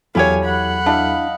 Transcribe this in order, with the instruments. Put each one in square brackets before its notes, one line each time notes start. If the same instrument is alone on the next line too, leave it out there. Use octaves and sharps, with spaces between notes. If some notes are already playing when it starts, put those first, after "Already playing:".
[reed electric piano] E2 F#3 A4 [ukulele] E4 G4 C#5 [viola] F5 G#5
[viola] F#5 B5
[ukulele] D4 E4 [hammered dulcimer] D#5 F5